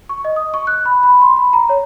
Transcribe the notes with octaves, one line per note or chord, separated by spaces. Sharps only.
C#6
D#5
D#6
C#6
F#6
B5
B5
C6
B5
A#5
C#5